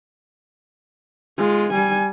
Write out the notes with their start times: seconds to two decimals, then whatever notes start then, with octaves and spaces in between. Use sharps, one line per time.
1.38 G#3 F4
1.73 G3 G#5